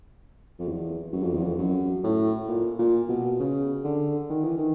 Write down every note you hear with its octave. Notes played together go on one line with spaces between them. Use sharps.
F2
E2
F#2
F2
E2
F2
F#2
A2
A#2
A#2
B2
C#3
D3
D#3
E3
D#3